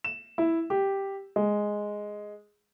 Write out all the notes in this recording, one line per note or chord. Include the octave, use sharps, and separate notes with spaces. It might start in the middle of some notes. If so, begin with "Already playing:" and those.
E7
E4
G4
G#3